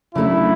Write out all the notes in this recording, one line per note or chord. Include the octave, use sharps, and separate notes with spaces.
C#3 F#3 A3 D4 E4